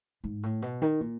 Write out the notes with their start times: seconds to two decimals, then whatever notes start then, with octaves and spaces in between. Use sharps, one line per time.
0.24 G#2
0.43 A2
0.62 B2
0.82 D#3
1.01 A#2